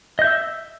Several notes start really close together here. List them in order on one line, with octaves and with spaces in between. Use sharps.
D#5 G6 E5 E6